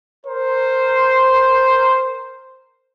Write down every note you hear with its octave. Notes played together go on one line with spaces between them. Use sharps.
A#4 C5